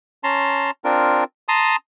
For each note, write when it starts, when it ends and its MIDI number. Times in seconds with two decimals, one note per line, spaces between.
0.24 0.71 61
0.24 0.71 81
0.24 0.71 82
0.24 0.71 84
0.84 1.24 60
0.84 1.24 62
0.84 1.24 65
0.84 1.24 70
1.48 1.76 81
1.48 1.76 82
1.48 1.76 84
1.48 1.76 87